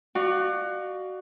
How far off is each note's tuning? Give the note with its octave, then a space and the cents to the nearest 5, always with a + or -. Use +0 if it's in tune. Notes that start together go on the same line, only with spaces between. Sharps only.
F#4 +15 D5 +40 F5 +5